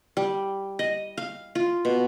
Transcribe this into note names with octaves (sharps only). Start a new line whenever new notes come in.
G3
D#5
F5
F4
B2